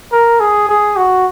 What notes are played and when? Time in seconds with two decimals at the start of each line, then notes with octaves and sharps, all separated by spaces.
0.13 A#4
0.40 G#4
0.69 G#4
0.97 F#4